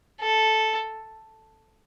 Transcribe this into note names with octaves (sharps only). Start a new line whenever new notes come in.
A4